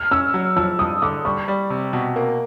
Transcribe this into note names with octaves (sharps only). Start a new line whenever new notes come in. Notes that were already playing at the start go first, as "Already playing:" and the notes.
Already playing: F6
C#4 E6
F#3
F3 E6
G2 D#6
D3 D6
G3 C#6
G3
C3
B2
A#3